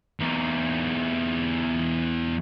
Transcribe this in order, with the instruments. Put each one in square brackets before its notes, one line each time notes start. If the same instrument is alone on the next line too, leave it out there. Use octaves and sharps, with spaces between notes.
[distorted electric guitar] E2 D#4